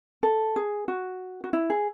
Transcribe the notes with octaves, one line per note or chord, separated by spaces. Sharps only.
A4
G#4
F#4
F#4
E4
G#4